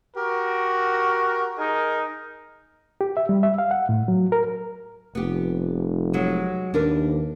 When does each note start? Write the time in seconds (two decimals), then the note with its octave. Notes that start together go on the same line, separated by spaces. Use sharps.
0.17 F#4 G4 A#4
1.58 D#4 G#4 A#4
3.01 G4
3.17 E5
3.29 G3
3.43 E5
3.58 F5
3.71 F#5
3.89 A2
4.08 F#3
4.32 A#4
5.15 F1 B3 G4
6.13 F#3 G#3
6.74 D#2 D4 A#4 B4